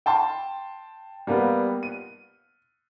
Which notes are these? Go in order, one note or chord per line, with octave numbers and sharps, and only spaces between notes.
G5 A5 C6
G3 A#3 B3
D#7